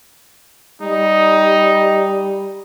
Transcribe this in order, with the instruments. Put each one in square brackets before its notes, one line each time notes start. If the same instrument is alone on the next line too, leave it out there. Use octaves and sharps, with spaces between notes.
[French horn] G3 [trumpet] D#4